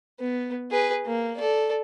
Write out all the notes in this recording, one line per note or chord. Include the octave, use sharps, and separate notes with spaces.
B3
G#4 B4
A#3
A4 D5